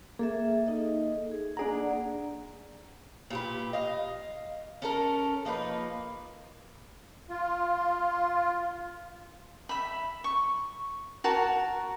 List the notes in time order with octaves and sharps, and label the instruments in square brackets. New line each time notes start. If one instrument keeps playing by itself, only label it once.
[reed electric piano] A#3 [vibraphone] G#4 A4 E5
[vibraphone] D#4 A4 D#5
G#4
[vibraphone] A#3 D5 F#5 [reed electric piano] D4 G#4 A#5
[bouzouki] A#2 G4 B4
D#5 F5
C#4 A4 A#4
F3 A#3 D#4 B4
[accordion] F4
[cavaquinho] E5 B5
C#6
F#4 A#4 A5